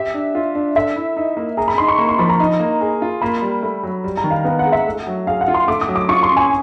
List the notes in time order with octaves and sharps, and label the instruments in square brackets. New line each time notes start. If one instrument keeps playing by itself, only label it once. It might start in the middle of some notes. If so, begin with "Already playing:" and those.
Already playing: [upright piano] G4 [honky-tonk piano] E5
[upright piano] D4
F4
D4
[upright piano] A4 [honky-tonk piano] E5
[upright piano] E4
D#4
A#3
[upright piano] G#4 [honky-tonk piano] A#5
[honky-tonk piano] B5
[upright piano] D#4 [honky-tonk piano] C6
[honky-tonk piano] C#6
[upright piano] A#3
[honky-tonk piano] C6
[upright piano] F3 [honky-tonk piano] B5
[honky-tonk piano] A#5
[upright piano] D#4
A#3
G#4
F4
[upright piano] A#3 [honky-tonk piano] B5
[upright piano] G3
A3
F#3
G3
[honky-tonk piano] A#5
[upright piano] D#3
[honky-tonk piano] F5
[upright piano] B3 [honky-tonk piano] F5
[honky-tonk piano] F#5
[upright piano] G#3
[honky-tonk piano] E5
[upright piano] A3
F#3
[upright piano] G#4 [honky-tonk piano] F5
[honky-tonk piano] F#5
[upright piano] F4
[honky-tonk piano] C6
[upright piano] A3 [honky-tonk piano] D6
[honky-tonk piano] D#6
[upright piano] F#3
[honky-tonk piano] D6
[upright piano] F4 [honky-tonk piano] C#6
[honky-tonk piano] C6
[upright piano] C#4
[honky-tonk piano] G#5